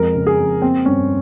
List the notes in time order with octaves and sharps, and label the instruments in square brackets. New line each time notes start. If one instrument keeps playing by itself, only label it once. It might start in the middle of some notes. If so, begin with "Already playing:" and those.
Already playing: [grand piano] F2 G#3 A#4
C#3
G#4
F2
A#3 C4
G2 C#4